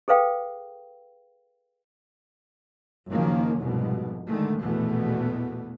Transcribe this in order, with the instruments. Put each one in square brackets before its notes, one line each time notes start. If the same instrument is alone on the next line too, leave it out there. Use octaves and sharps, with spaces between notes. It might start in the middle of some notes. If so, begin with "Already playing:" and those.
[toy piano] G#4 A4 B4 F5 G5
[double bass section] F#1 D#3 F3 A#3 C#4
F1 C2 G#2 B2
D3 D#3 G#3 A3
A#1 E2 B2 E3 A3 B3